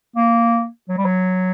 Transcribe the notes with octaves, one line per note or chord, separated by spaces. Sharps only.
A#3
F#3
G3
F#3